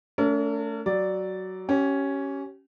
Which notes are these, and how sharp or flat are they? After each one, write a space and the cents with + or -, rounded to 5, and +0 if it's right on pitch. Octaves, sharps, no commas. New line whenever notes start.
A3 +0 C#4 +45 A#4 -45
F#3 +15 D5 +0
C#4 +0 G4 -30